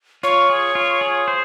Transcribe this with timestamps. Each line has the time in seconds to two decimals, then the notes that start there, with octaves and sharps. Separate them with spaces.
0.23 F4 C#5
0.50 G#4
0.75 F4
1.01 G#4
1.28 C5